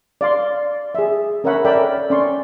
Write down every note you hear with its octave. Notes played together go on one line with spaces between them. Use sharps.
D5 F5 C6
G#4 E5
C#4 A#4 C#5 E5 F#5 B5
A4 A#4 D5 E5 G5 B5
C#4 D5 C6 C#6